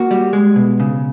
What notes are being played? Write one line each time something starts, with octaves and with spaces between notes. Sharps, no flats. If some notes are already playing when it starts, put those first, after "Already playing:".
Already playing: A#3 F#4
G3
G#3
B2
C#3